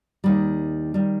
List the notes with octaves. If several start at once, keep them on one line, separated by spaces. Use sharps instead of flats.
D#2 D#3 G3
D#3 G3